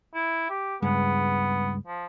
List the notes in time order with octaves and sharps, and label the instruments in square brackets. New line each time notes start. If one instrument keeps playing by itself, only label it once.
[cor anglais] E4
G4
[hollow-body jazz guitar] C#2 G2 G#3 [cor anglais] B3
[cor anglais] F3